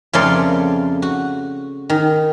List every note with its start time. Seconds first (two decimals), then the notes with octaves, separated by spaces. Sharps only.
0.13 F2 C#3 A3 A#4 D5 C6
1.02 F#4
1.90 D#3